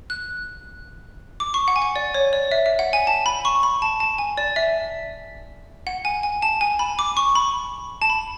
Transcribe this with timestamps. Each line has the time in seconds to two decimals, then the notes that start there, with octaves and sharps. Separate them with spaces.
0.10 F#6
1.40 D6
1.54 C#6
1.68 F#5
1.76 G#5
1.82 F#5
1.96 D5
2.14 C#5
2.33 D5
2.51 E5
2.66 E5
2.79 F#5
2.93 G#5
3.07 A5
3.26 B5
3.45 C#6
3.63 B5
3.82 A5
4.00 A5
4.18 G#5
4.37 D5
4.56 E5
5.87 F#5
6.05 G#5
6.23 G#5
6.42 A5
6.61 G#5
6.79 B5
6.99 D6
7.17 C#6
7.35 B5
8.02 A5
8.10 B5